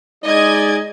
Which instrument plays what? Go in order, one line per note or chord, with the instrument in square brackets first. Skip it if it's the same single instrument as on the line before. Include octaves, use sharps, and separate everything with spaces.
[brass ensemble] G#3 D#4 D5 [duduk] G#4 [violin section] D#5 G#6